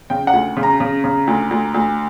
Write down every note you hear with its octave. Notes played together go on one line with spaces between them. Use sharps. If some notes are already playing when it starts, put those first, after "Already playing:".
C#3 G5
F#5
D2
C#3
A#5
C#3
C#3
D2
D2
D2